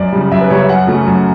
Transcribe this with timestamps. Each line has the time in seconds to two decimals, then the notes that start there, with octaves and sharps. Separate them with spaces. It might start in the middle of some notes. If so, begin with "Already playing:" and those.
Already playing: F#2 D5
0.12 C#3 G3
0.31 F#2 E5
0.41 B4
0.50 C#3 G3 C#5
0.59 E5
0.69 F#2 F#5
0.87 C#3 F#3 A3
1.06 F#2